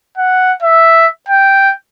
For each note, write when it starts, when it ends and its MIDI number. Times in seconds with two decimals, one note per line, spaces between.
0.18 0.54 78
0.62 1.07 76
1.29 1.73 79